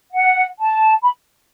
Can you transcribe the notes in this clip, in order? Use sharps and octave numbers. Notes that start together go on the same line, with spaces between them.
F#5
A5
B5